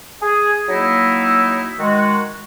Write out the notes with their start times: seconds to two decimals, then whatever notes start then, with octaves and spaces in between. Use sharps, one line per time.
0.22 G#4
0.68 F#3 A#3 D#4 E4
1.79 D#3 G#3 F#4